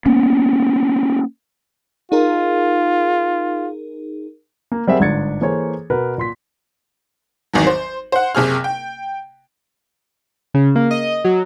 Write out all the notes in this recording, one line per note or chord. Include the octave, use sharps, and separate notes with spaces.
A#3 B3 C#4
D#4 F4 G#4 A#4
A#3
G3 C4 G#4 A#4 E5 F#5
G1 G#2 D4 G#6 A6 C#7
E3 A#3 G#4 A4 C5 C#5
B2 A#4 B4
A#2 C6 B6
G#1 E2 D#3 F#3
C5
C5 F#5
F#1 C3 G#4 F6
G5
C#3
A#3
D#5
F#3